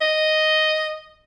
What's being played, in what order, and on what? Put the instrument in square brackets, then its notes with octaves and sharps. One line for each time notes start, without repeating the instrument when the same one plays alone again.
[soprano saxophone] D#5